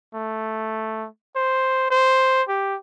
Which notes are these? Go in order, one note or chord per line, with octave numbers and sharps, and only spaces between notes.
A3
C5
C5
G4